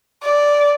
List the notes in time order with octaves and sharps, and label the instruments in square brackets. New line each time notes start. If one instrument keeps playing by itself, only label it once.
[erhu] D5